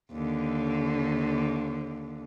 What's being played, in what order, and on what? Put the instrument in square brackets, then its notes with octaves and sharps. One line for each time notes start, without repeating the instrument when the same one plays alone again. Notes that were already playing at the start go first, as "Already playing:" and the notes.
[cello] D#2 D3